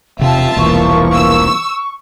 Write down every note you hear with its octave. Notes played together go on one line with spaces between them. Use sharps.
E1 C3 C4 F4 E5 G5 A5
E1 C2 E3 F3 A#3 C#6
E6